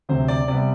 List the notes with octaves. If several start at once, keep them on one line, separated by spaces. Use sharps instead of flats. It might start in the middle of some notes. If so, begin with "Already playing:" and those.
D2 C3 F#3 C4 C5
D5
C3 G3 B3 D5